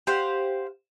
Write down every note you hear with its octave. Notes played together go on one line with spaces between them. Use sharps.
G4 C5 F5 F#5